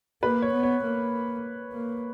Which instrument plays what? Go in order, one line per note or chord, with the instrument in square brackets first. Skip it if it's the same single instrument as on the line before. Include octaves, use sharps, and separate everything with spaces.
[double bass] A#3 [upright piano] B4
[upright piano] C#5
[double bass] B3
[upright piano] C#5
[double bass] A#3
A#3